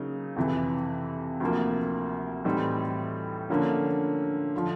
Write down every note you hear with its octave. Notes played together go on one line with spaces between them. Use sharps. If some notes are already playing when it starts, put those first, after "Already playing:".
Already playing: C#3 F#3 A#3 D#4
F2 C3 E3
D2 C3 F3 A#3
A2 E3 G3 C4 D#4
D3 F3 A#3 C#4
D3 F3